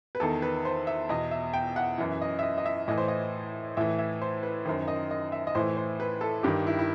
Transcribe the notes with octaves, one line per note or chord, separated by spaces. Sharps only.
B4
E2 D#3 A4
B4
C5
E5
E2 B2 D#5
E5
G5
F#5
F#2 E3
D#5
E5
D#5
D#5
E5
A2 E3 D#5
C5
D#5
A2 E3 E5
E5
C5
B4
F#2 D#3 C5
D#5
D#5
E5
D#5
A2 E3 C5
C5
B4
A4
G2 D#3 G4
E4
E4